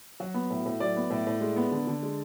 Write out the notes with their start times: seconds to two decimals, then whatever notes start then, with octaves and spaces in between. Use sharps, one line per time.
0.20 F#3 F#4
0.34 B3
0.50 A2
0.65 A2
0.80 F#3 D5
0.96 B3
1.10 A2
1.27 A2
1.41 G#3
1.56 B3
1.71 D3
1.87 D3
2.03 G#3